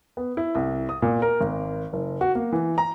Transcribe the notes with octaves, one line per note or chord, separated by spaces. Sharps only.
B3
E4
C2
D#6
A#2
A#4
G#1
F#1
F#4
A#3
E3
A#5